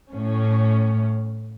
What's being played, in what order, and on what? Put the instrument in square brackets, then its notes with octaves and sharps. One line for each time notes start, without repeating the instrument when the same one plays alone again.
[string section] A2 C#4